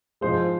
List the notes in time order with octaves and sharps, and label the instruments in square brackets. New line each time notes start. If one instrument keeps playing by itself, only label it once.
[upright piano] G#2 F3 G#3 C5